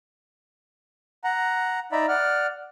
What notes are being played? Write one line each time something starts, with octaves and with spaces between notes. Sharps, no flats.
F#5 A#5
D#4 D5 E5 A#5 B5
D5 F#5 F6